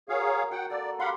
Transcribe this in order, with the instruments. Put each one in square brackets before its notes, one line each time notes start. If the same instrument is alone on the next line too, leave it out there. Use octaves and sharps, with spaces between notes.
[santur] F#4 A#4 [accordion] G#4 C#5 F5
[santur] F#4 [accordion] F#5 G5
[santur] A#3 A4 [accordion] D5
[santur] G4 C6 [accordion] F5 F#5 B5